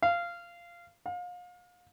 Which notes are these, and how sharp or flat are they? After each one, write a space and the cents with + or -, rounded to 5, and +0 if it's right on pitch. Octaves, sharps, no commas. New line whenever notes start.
F5 -15
F5 +35